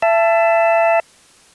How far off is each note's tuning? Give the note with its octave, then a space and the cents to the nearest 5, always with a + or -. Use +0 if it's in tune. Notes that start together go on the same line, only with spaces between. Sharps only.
E5 +30 A5 +0